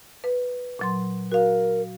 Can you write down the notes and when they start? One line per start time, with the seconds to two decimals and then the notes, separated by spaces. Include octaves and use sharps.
0.24 B4
0.79 A#2 F#3 C6
1.32 F#4 A#4 F5